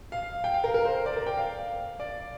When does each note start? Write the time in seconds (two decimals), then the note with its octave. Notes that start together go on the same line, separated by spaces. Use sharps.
0.12 F5
0.44 G5
0.54 F5
0.64 A#4
0.74 A#4
0.85 C5
1.06 D5
1.16 A#4
1.26 G5
1.37 F5
2.00 D5